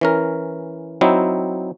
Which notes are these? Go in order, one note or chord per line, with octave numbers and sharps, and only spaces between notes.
E3 C#4 A#4
F#3 C4 D#4 E4